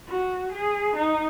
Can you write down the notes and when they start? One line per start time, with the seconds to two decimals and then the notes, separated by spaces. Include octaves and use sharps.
0.08 F#4
0.52 G#4
0.96 D#4